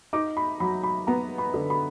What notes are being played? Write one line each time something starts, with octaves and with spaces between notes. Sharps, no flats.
D#4 D6
B5
F#3 B5
B5
B3 A#5
B5
D3
B5